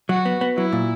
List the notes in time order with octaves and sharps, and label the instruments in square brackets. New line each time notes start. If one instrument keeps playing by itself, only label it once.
[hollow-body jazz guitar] F#3 [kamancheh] F#4
[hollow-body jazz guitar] B3
B3
[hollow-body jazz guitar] F#3 [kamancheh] E4
[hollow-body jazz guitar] A#2